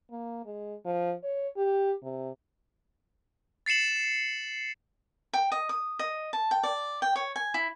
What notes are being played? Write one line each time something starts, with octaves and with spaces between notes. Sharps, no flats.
A#3
G#3
F3
C#5
G4
C3
A6 C7 C#7 E7 F#7
G5
D#5
D#6
D#5
A5
G5
D5
G5
C#5
G#5
E4